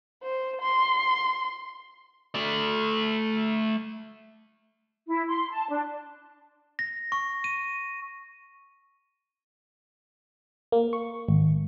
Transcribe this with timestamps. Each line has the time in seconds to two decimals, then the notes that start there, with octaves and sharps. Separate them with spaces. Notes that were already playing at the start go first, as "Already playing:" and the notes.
0.23 C5
0.61 C6
2.35 A3 D5
5.08 E4
5.28 C6
5.53 A5
5.69 D4
6.79 A#6
7.12 C#6
7.44 D#7
10.72 A#3
10.93 C#6
11.29 G#1